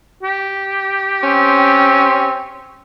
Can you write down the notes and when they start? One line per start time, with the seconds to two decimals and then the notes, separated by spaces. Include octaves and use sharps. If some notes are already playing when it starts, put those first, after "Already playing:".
0.23 G4
1.23 C4 C#4